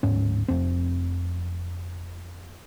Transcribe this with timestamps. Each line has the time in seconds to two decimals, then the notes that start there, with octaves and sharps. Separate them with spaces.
0.03 D1 G#2 C#4
0.48 F1 F2 C4